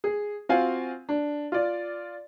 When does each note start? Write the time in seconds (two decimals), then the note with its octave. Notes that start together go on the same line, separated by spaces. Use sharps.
0.04 G#4
0.49 C4 F4 F#4 F5 F#5 G#5
1.09 D4
1.52 F4 D5